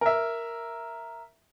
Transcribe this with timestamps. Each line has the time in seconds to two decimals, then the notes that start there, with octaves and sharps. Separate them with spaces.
0.01 A#4 E5